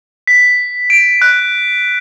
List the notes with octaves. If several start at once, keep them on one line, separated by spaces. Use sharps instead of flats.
B6
D7
F#6